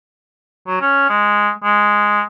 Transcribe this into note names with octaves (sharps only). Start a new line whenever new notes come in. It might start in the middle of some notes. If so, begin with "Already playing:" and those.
F#3
C#4
G#3
G#3